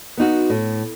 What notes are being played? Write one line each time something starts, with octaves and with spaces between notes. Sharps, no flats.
B3 D#4 F#4
A2